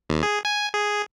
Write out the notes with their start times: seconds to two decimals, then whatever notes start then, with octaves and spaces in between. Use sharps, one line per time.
0.10 D#2
0.23 G#4
0.45 G#5
0.74 G#4